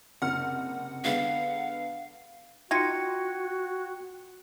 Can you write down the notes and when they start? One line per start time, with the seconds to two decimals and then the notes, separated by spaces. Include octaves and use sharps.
0.22 F#1 C3 F#5 F6
1.04 D3 G#3 B3 F5
2.71 D#4 F4 F#4 G5 G#6 C#7